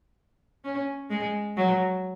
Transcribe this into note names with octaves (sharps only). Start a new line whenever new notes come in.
C#4
G#3
F#3